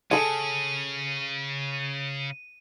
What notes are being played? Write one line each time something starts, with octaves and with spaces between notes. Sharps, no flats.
C#3 G#4 A4 D#7